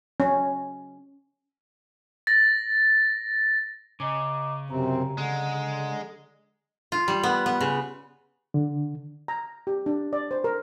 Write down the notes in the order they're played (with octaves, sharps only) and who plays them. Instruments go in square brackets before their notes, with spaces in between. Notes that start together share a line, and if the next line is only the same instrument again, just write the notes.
[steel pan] C#4
[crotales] A6 A#6
[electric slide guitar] C#3 C#4 [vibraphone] D#5 A#5 D6
[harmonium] F#2 C3 C4 [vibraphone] A#5
[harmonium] D3 [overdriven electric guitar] G#3
[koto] F4
G3
B3
B3
C#3
[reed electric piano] D3
[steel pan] A#5
G4
D4
D5
C5
A#4